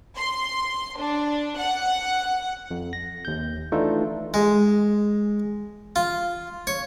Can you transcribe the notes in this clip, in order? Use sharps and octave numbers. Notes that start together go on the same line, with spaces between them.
C6
D4
F#5
F2
A#6
D#2 G6
E3 A3 D4 D#4 F4 A4
G#3
F4
C#5